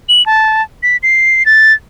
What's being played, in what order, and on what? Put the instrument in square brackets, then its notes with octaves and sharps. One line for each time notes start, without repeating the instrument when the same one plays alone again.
[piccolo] F#7
A5
B6
C7
A6